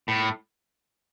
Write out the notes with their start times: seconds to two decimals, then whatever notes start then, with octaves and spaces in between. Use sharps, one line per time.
0.08 A2